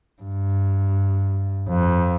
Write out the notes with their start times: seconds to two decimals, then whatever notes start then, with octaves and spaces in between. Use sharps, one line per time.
0.22 G2
1.69 F2